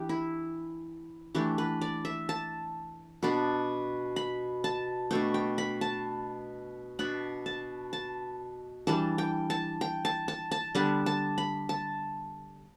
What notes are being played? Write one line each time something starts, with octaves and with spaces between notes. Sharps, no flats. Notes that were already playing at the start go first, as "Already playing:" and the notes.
Already playing: E3 B3 D4 G4
E4
E3 A3 D4 G4
B4
D5
E5
A5
B2 B3 D4
B5
A5
B2 A3 D4 G5
G5
B5
A5
B2 B3 D4 B5
A5
A5
E3 G3 D4 A5
G5
A5
G5
A5
A5
A5
D3 G3 B3 D4 A5
A5
B5
A5